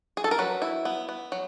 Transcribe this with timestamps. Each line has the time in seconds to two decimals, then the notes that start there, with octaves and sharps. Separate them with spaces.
0.17 G#4
0.24 A4
0.31 A#4
0.39 F#3 B4
0.62 E4
0.85 B3
1.09 B3
1.32 F#3